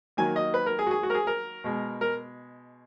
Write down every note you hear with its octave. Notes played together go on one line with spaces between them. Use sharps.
D#3 F#3 A#3 G#5
D#5
B4
A#4
G#4
F#4
G#4
F#4
A#4
G#4
A#4
B2 G#3
A#4